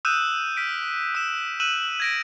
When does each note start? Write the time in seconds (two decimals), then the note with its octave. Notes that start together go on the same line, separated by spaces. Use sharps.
0.05 D#6 E6 F#6 G6 D#7 E7
0.57 F6 B6 D7
1.15 E6 E7
1.60 E6 F#6 D#7 E7 F#7
2.00 G#6 A#6 D7